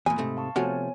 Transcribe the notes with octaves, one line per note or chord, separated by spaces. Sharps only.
E2 A#2 G#5 B5 D#6
G#2 C3 A3
F5 A5 C#6
C3 F3 A3 B3 F#4 C#5 F5 G#5